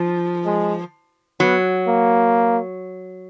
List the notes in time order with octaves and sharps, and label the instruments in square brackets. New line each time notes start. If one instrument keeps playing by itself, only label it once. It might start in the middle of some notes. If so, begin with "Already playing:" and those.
Already playing: [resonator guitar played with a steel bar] F3
[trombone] G#3
[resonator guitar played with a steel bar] F#3 [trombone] B3
[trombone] A#3